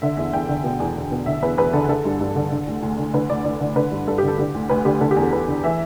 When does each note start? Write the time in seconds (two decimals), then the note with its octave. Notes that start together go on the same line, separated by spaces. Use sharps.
0.02 D3 E5
0.17 E2 E5
0.33 E2 G5
0.49 D3
0.64 B2
0.80 E2
0.96 E2
1.12 B2
1.26 D3 E5
1.42 E2 B4
1.57 E2 B4
1.73 D3 A4
1.89 D3 A4
2.05 G2
2.21 G2
2.36 D3
2.52 D3
2.67 D2
2.83 D2
2.98 D3
3.14 D3 B4
3.29 D2 D5
3.45 D2 D5
3.60 D3
3.76 D3 B4
3.91 G2
4.08 G2 A4
4.18 G4
4.23 D3 A4
4.38 D3 G4
4.55 D2
4.70 D2 B4
4.85 D3 G4
5.01 D3 A4
5.11 G4
5.16 E2
5.22 A4
5.32 E2 B4
5.48 D3
5.63 E3 E5